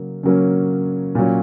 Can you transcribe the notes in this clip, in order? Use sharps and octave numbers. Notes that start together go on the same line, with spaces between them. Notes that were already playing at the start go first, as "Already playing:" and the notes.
Already playing: C#3 F#3 A#3
C#3 F#3 A#3 C#4
A#2 F#3 C#4